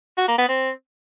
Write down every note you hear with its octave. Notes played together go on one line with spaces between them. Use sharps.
F#4
A#3
B3
C4